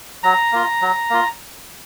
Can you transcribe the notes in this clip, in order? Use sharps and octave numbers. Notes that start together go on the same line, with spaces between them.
F#3 A#5
A#3 F4
F#3
A#3 F4